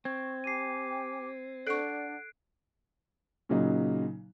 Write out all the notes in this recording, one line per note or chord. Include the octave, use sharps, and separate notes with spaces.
C4 C#6 G#6
G4 G#5 D6 C7 D#7
D4 A4 D5 F#5 C#6 F#6 C7 D7
A#2 C#3 F#3 D#4